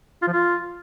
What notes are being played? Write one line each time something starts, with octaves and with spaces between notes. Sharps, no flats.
F4
F3
F4